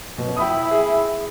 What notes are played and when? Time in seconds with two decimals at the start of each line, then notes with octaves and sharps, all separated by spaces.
0.18 F#2 B2
0.37 E4 G5 B5 D#6
0.71 G#4